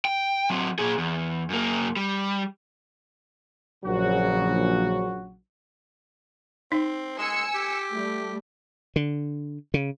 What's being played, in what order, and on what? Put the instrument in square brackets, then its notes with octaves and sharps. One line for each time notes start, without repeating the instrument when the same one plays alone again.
[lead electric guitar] G5
F#3 C4
A#2 G#4
E2
F#2 A#3
G3
[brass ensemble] A#1 C#3 F#3 F#4
[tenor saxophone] C4 [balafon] D#4
[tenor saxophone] G#3 [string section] G#5 E6 C#7
[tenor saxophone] G4
[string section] G3 A3
[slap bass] D3
C#3